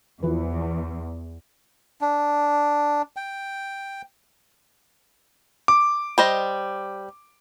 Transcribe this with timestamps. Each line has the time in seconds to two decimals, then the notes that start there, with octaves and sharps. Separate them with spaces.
0.23 E2 E3 F3 B4
2.01 D4
3.17 G5
5.68 D6
6.18 G3 C5 D#5